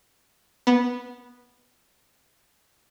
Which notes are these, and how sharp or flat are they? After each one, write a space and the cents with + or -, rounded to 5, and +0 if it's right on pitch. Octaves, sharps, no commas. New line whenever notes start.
B3 -10